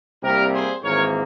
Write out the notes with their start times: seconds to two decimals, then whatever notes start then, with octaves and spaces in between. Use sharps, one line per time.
0.23 C2 C3 G3 A#3 G4 A#4
0.53 G#4 C5
0.83 G#1 G#2 E3 A#3 A#4 C#5